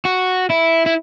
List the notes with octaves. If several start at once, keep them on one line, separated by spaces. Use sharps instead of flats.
F#4
E4
E4